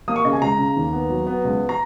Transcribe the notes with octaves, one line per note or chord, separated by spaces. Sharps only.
A#3 D#6
C#6
C#3 D#5
G#5
C#2 A#5
C#3
D#2
B3
F#3
B3
C#2
A#5